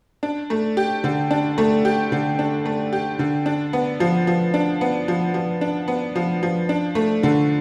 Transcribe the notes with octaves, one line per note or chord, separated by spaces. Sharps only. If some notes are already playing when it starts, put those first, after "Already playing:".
D4
A3
G4
D3
D4
A3
G4
D3
D4
A3
G4
D3
D4
B3
F3
F3
D4
B3
F3
F3
D4
B3
F3
F3
D4
A3
D3